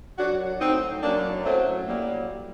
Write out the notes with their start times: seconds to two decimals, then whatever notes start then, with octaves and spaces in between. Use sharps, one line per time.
0.18 F#2 F#3 D4 F#4
0.61 A2 F#3 C4 D#4
1.03 F#2 F#3 A#3 D4
1.45 A2 F#3 A3 C4
1.87 A2 F#3 G3 A#3